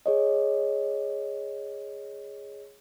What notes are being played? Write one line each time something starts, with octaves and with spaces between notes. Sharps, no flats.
G#4 C#5 D#5